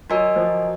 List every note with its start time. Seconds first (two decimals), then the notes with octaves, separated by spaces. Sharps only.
0.10 F#3 F#4 A#4 D#5 G#5
0.36 F3